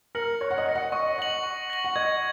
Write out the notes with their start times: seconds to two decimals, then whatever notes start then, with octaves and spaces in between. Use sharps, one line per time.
0.15 A#4 A#6 C#7 F#7
0.41 C#5 F#6
0.51 F#5
0.58 D#5
0.66 A#6 C#7 F#7
0.75 F#5
0.92 D#5 C#6
1.18 F#5 A#6 F#7
1.43 C#6
1.70 A#6 F#7
1.84 F#5
1.96 D#5 G#6